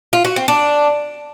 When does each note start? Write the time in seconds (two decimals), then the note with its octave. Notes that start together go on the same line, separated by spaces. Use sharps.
0.13 F4
0.25 F#4
0.36 C4
0.48 D4